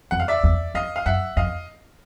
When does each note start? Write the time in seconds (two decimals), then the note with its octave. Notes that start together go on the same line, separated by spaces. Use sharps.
0.11 F2 F#5
0.20 F5
0.28 D5 E5
0.44 E2
0.74 F2 D#5 F5
0.96 F5
1.06 F#2 E5 F#5
1.36 F2 D#5 F5